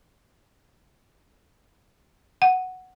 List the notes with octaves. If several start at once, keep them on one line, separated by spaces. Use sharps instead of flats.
F#5